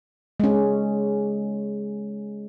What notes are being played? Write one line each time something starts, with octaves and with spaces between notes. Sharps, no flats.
G#3 C#4